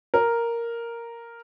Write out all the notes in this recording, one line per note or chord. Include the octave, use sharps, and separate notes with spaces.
A#4